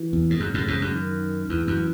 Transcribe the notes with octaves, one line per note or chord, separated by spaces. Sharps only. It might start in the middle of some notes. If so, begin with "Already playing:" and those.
Already playing: E3
E2
G#2
F#2 C#3
F#2 A2
E2 G#2
F#2
D#3
E2 E3
F#2